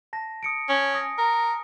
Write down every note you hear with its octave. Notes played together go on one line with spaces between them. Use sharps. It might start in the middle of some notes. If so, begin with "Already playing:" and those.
A5 A#6
D#6 C#7 D7
C#4
G#5 D#6 A#6
A#4